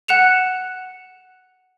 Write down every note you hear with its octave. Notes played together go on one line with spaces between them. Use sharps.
F#5 F#6 C#7 E7 F7